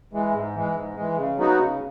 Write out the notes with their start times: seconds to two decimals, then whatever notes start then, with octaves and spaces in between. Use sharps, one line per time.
0.13 E3 G#3
0.34 G#2
0.55 E3 G#3
0.75 G#2
0.96 E3 G#3
1.17 C#3
1.37 F#3 B3 D#4 F#4
1.58 C#3